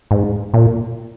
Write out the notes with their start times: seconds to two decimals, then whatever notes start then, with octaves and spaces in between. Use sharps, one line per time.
0.11 G#2
0.54 A#2